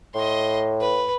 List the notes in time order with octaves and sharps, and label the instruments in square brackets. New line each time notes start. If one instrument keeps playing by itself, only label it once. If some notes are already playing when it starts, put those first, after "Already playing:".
[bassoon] A2 [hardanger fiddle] D#5 C6
[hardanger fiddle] B4